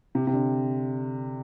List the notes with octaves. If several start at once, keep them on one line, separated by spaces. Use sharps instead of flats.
C3
C3
D3